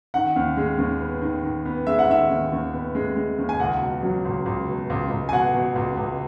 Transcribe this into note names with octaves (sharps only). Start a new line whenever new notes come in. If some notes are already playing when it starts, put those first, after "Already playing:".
D#3 F#5
D#2
G#3
D#2
B3
D#3
D#3
B3
G#3 E5
F#5
D#3 E5
D#2
D#2
B3
G#3
G#3
D#2
G#5
C#2 F#5
B2
F#3
C#2
C#2
B2
C#2
C#2
G#5
B2 F#5
B2
C#2
C#2